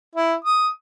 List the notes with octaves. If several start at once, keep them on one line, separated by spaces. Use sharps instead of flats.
E4
D#6